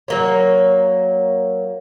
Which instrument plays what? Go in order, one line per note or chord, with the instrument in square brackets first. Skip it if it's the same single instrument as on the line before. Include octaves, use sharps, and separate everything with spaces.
[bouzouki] F#3 A#3 C#5